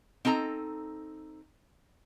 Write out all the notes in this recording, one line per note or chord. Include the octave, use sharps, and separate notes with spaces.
C4 D#4 A4 A#5